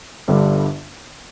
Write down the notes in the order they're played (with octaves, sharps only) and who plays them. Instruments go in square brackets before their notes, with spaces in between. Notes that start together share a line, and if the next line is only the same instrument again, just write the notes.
[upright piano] G1 G2 D3 G3